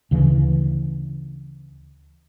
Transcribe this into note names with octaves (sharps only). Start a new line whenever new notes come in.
D2 C#3 E3